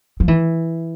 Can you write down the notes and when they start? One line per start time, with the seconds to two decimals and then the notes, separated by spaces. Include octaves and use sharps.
0.20 F3
0.28 E3